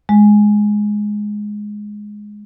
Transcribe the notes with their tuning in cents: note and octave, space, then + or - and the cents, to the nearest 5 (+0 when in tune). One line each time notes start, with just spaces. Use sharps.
G#3 +5